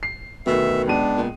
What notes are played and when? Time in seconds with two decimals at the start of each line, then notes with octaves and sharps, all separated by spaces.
0.03 C7
0.47 D2 B2 D#3 E5
0.88 C#2 B3 D4 D#7
1.17 A#2